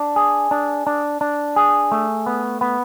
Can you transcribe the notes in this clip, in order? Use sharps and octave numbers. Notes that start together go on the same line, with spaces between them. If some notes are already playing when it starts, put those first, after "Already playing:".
Already playing: D4
G#4
D4
D4
D4
G#4
A3
B3
B3